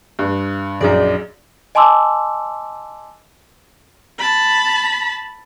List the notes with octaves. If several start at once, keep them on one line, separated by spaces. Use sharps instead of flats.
G2
A#1 F#2 D#4 G#4 D5
D#5 G#5 A5 C6 D6 E6
A5 B5